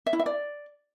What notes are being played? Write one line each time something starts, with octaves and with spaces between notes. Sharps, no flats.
E5
E4
E5
D5